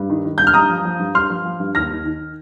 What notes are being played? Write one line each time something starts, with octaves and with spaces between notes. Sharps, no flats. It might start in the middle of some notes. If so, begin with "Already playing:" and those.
Already playing: G2
D#3
D#3
G2 G6
F6
G2 A#5 D#6
F3
F3
G2
G2 C6 F6
F3
F3
G2
D#2 F6 A#6
D#3
D#3